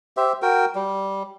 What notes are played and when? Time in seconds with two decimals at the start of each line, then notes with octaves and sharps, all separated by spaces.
0.17 G4 C5 E5
0.42 F#4 A#4 G5
0.75 G3